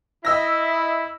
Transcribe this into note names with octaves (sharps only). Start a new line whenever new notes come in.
E4 D#5 E6 A#6